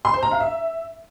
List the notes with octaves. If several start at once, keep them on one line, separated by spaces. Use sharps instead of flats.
C6
C5
A#5
F5
E5